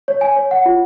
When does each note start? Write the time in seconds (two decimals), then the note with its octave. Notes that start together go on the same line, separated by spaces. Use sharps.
0.08 C#5
0.21 G#5
0.36 C#5
0.51 F#5
0.66 F4